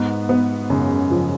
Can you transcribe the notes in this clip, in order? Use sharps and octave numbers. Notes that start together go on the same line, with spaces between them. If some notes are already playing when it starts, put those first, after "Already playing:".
Already playing: G#2 B3
B3
F#2 C#3
F3